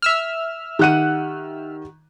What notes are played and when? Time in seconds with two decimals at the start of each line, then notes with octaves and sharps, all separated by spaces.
0.02 E5 E6 F6
0.79 D#3 G4 F#5 F#6 D#7